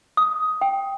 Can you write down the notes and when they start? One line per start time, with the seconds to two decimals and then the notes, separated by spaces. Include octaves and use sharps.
0.17 D#6
0.61 G5